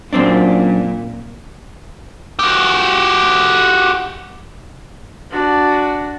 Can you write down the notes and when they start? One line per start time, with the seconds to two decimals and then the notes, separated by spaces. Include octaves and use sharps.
0.13 F#2 A#2 C4 D4
2.39 F#4 G4
5.31 D4 F#4